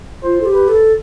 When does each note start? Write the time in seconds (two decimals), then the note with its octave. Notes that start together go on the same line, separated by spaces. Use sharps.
0.23 F4 C5
0.41 A4
0.46 G4
0.54 B4
0.68 A4